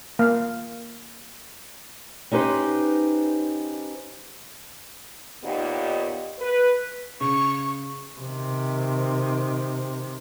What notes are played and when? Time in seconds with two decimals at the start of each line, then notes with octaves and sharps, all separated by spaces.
0.19 A#3 F5
2.31 C#4 D#4 G4 B4 C5
5.43 D#2 A#2 B3 D#4 G4
6.39 B4
7.21 C#3 C#6
8.20 C3 D#3